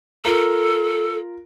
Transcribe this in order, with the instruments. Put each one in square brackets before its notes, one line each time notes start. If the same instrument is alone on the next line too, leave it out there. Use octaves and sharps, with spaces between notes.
[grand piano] F4 A#4 [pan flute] A4